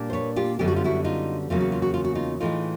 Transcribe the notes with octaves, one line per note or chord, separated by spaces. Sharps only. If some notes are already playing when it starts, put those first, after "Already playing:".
Already playing: A#2 G3 A#3 D4
C5
B4 C#5
F4 G4
F#2 D3 G3 B3 G4
F#4
F4
E4 F#4
D#4 F4
E2 C#3 F#3 A#3 F4
F#4
F4
F#4
F4
F#4
D#4 F4
A2 E3 G#3 D#4 F4